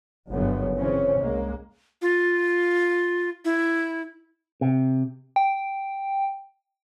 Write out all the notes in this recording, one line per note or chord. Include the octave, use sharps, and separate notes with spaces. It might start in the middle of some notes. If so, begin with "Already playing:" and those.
G1 F#2 C#3 B3
C#3 E3 C4 C#4
C2 G#3 A#3
F4
E4
C3
G5